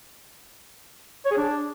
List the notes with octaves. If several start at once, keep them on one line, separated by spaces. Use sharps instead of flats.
C#5
G#4
D4